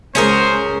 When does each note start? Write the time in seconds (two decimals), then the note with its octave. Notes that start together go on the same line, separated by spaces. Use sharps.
0.15 C#2 C#4 G#4 A#4 C5